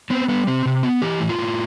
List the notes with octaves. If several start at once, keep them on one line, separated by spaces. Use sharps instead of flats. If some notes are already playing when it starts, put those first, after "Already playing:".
B3 C4
G3 B3
C3 C4
C3
B3
E3 G4
A2
F4
A2